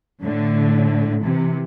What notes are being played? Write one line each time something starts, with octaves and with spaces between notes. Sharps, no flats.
A2 D3
C3 E3